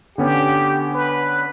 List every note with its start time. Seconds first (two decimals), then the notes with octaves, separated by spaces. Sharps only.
0.18 D3 B3 C#4 G4
0.94 B4